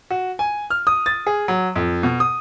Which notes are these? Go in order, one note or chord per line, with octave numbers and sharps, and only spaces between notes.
F#4
G#5
F6
D#6
A6
G#4
F#3
F2
B2
D#6